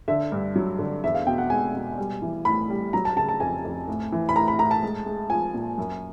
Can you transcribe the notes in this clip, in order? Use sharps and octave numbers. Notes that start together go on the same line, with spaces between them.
D3 E5
G2
F#3
D3
E2 E5
F5
B2 G5
F#5
G#3 G#5
B2
G3
E3
A2 B5
G3
F#3 A#5
A5
C#3 A5
A5
F2 G#5
F2
A2
E3
B5
A2 A#5
B5
A2 A#5
A5
G#3
G#3
F3 G#5
A#2
F#2